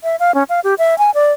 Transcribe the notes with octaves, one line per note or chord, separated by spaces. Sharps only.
E5
F5
C#4
F5
G4
E5
G#5
D5